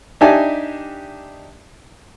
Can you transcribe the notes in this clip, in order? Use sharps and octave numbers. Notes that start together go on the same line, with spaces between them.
D4 D#4 G4 E5 G#5 A5